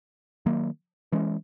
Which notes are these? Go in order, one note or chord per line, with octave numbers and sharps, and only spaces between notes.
D#3 F#3 A#3
E3 G#3 C#4